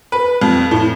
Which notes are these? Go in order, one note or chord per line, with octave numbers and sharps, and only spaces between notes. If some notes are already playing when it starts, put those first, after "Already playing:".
B4
F2
A2